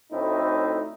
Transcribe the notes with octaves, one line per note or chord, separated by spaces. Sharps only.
D2 A2 C4 D#4 E4